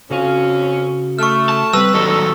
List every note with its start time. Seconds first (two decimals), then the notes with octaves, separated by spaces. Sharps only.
0.10 F2 C#3 C#4 F#4 F5
1.19 A3 C#6 F6
1.49 A5
1.73 G3 C4 B4 E6
1.94 D#2 F#3 D4 D#4 A4